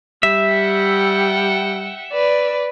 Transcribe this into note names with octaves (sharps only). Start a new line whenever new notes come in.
G3 E5
F#5 G5
B4 D5